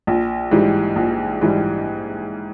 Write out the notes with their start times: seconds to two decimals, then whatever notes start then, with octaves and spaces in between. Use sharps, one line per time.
0.07 A#1
0.51 G#2 E3 G3
0.96 A#1
1.41 G#2 E3 G3